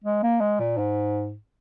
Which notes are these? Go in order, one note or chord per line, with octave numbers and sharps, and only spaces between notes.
G#3
A#3
G#3
A#2
G#2